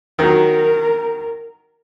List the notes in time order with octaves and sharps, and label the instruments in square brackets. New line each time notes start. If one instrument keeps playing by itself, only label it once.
[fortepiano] D#3 F#3 [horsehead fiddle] A#4